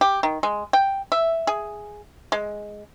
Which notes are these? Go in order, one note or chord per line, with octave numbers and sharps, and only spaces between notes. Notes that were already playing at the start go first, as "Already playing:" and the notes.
G4
D#3
G#3
G5
E5
G#4
G#3